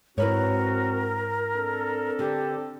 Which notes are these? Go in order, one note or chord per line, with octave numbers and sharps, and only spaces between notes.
G#2 C4 E4 F#4 A#4 B4 C#5
C4 D4 A4
D3 G4